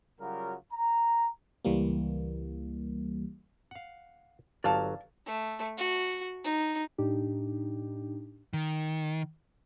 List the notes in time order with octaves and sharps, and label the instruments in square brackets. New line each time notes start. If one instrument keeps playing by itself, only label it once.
[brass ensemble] C#3 F#3 G3 F4 F#4 A#4
A#5
[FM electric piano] C#2 E3 G3 A#3
[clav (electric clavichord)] F5 F#5
[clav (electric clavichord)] G1 F#3 [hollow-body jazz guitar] D5 F5 A5
[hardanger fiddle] A3
F#4
D#4
[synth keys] A2 D4 D#4 G4
[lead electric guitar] D#3